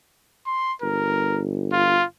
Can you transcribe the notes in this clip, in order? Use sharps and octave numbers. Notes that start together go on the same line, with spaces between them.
C6
G1 A#4
F4